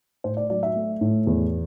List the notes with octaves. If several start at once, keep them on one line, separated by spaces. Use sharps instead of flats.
A2 C5
D5
F#3 D5
E5
A3
A2
E2